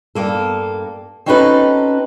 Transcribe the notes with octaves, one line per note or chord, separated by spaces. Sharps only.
G2 A#3 A4
C4 C#4 D#4 F#4 A4 B4